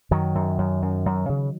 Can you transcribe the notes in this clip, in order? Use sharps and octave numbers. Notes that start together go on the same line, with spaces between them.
F#2 D#3 F#3
F#2
F#2
F#2
F#2
C#3